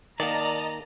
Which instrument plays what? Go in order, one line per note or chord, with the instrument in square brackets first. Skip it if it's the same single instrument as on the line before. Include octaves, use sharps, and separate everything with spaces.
[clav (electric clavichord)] D#3 A#3 [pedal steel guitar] D5 [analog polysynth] D#5 A5 [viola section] A#5